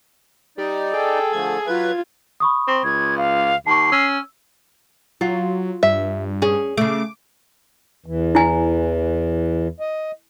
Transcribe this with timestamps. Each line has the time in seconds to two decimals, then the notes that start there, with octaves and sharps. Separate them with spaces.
0.58 G3 D#4 D5
0.94 G#4 A4 G5
1.33 D3 F3 A3 G#6
1.67 F#3 F4 B4 G#6
2.40 B5 C#6 D#6
2.68 C4
2.84 C#2 G#6
3.18 F5
3.67 D#2 A5 C#6 C7
3.92 C#4 E6
5.21 F#3 F4
5.83 G2 E5
6.42 C#4 G#4
6.77 C#3 A3 D6
8.06 E2 E3
8.35 E4 G#5
9.80 D#5